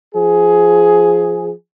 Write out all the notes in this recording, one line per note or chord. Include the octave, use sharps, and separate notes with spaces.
F3 G#4